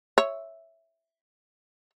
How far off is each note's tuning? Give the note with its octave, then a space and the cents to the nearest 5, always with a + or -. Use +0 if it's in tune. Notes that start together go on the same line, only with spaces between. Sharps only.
C#5 +0 E5 +0